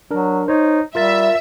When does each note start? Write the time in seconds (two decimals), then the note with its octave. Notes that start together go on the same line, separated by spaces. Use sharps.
0.11 F#3 D4 A#4
0.48 D#4 C5 C#5
0.95 G3 F4 A#4 E5 A6